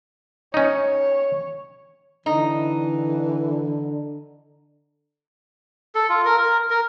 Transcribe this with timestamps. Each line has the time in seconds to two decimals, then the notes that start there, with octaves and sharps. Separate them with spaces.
0.54 C#4 D#4 C#5
2.26 D3 E3 D#4
5.95 A4
6.09 F4
6.25 A#4
6.38 A#4
6.70 A#4